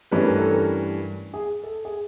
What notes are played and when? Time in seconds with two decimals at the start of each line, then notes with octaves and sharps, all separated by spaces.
0.11 G2 E3 A3 C#4 B4
0.25 A#4
0.38 A4
0.51 A#4
1.34 G#4
1.63 A4
1.85 G#4